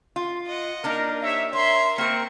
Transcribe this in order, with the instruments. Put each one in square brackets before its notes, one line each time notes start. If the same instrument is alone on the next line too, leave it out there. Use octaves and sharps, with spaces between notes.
[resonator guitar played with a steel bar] F4
[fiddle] D#5 F#5
[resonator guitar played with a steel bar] A#3 D4 D#4 [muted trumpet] A#4
[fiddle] G4 C#5 [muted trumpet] E5
[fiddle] A#4 E5 [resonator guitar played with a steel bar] C#5 [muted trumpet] C6
[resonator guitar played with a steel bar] A#3 A#4 [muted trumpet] C4 [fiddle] C#6